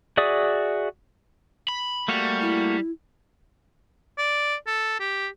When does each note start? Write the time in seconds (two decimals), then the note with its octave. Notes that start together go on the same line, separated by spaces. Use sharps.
0.17 F#4 G#4 D5 E5 D#6
1.69 B5
2.08 G3 A3 A#3 F#4
2.41 E4
4.18 D5
4.67 A4
5.00 G4